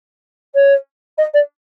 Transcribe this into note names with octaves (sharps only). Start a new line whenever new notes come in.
C#5
D#5
D5